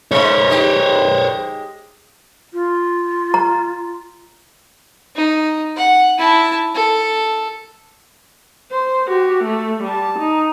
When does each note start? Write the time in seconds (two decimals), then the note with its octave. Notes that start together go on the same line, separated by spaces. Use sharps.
0.11 G#2 C#3 G#3 C5 C#5
0.49 G#3 D#4 G4
2.53 F4
3.34 A#5
5.16 D#4
5.77 F#5
6.18 E4 A5
6.75 A4
8.71 C5
9.08 F#4 G4
9.44 A3
9.84 G3 A5
10.19 D#4